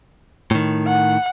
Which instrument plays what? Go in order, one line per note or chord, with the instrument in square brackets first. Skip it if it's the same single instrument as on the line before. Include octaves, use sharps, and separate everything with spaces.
[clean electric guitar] A2 D#3
[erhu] F#5